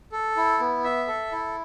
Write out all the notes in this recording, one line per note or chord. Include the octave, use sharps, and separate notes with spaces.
A4
E4
B3
E5
A4
E4